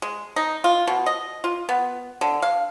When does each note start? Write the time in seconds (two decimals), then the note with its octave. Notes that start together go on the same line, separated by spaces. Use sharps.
0.02 G#3
0.36 D#4
0.64 F4
0.87 B2
1.06 D#5
1.44 F4
1.69 B3
2.21 D3
2.42 F5